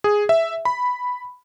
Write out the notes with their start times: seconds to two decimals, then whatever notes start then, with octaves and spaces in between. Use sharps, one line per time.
0.04 G#4
0.29 E5
0.65 B5